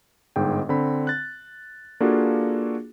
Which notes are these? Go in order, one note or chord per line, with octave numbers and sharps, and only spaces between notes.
G1 G#2 G5
D3 C4 B5
F#6 A6
A#3 D4 F4 F#4 G#4 A4